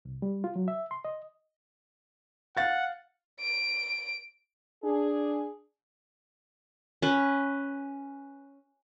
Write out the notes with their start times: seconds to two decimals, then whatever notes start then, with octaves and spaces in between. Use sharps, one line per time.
0.05 C2
0.22 G3
0.44 F4
0.56 F#3
0.68 E5
0.91 C6
1.05 D#5
2.57 F5 F#5 A6
3.41 D7
4.84 D4 G#4
7.02 C#4 B4